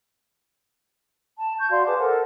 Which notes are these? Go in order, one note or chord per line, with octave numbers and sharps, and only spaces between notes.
A5
C#6 G6
F#4 D5 F5 C6
G#4 B4 A5 D6
A4 A#4 C5 F#5